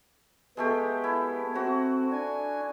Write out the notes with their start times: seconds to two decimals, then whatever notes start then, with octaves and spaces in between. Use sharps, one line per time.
0.57 G#3 A3 B3 G4
1.04 E4
1.55 C4 F#4
2.12 D4 G#5